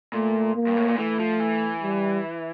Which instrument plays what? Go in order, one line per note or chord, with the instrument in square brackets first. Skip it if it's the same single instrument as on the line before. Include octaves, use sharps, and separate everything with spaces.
[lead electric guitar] A#2 [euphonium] A3
[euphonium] A#3
[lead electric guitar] G2
A2
A#2
[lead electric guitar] E3 [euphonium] A3
[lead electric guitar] F3
E3
[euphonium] G3